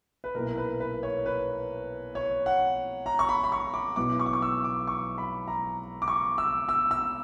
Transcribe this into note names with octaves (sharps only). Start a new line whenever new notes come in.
B4
B1 A#2 A#3 E4 A#4
B4
B4
C#5
B4
C#5
F#5
A#5
C#6
B5
B5
C#6
D6
B1 B2 F#3 B3 E4 D6
C#6
D6
C#6
E6
D6
C#6
B5
A#5
D6
C#6
E6
E6
E6